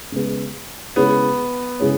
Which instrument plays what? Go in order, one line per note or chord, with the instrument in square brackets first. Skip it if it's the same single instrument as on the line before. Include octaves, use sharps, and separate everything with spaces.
[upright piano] C#3 G#3 B3
[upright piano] C#3 G#3 E4 G#4 C#5 [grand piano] B3
[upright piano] C#3 G#3 E4 G#4 C#5